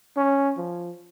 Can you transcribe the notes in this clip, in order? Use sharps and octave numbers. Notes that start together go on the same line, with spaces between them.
C#4
F3